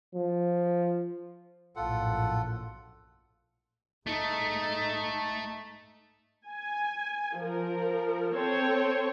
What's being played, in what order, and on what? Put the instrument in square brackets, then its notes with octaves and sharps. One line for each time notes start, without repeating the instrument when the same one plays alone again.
[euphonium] F3
[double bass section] A#1 F#2 A2 [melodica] F4 A4 F#5
[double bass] G#2 D#4 [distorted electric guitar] A3
[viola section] G#5
F3 A#4
C4 A4 C5 C#5